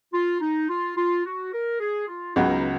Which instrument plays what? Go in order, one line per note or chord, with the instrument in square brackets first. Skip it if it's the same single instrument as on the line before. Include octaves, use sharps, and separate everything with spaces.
[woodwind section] F4
D#4
F4
F4
F#4
A#4
G#4
F4
[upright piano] C#2 C#3 F#3 B3 F#4 [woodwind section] D#4